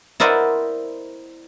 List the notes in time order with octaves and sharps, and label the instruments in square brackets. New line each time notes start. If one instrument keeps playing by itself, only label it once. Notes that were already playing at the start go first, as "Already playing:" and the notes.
[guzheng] E4 A#4 C5 D5 D#5 F#5